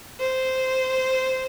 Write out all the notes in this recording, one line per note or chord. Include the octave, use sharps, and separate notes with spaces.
C5